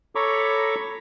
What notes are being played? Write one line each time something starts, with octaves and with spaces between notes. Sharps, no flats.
A4 C#5 A#5 B5 C#6 D6